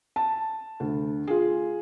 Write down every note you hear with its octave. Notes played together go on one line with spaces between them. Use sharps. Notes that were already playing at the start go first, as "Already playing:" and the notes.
A5
D2
F4 G#4